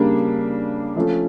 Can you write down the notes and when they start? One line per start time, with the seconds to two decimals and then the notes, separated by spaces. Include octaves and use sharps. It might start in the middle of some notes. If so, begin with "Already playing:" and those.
Already playing: C#3 G3 A#3 D4
0.96 F3 A3 C#4 F4 A4